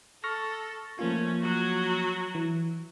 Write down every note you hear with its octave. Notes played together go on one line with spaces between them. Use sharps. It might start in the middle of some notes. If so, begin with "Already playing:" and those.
A4 C#6 F6 A#6
F3 A3 A#3 C#4 F4
F#3 F#4
E3